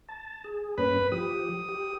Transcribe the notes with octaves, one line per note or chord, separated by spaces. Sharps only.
A5
G#4
G2 A#3 C#4 B4
F3 G4 D#6
G4